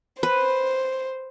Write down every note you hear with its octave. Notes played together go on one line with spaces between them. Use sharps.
B4 C5